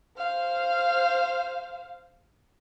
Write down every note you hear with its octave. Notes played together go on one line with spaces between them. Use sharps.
C5 F5